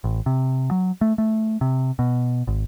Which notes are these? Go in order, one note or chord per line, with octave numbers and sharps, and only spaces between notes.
A1
C3
F#3
A3
A3
C3
B2
G#1